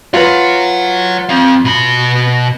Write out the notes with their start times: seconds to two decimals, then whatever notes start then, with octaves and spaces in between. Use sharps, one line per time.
0.14 F4 B4 C#5 F#5
1.29 C4 F5
1.65 B2 B5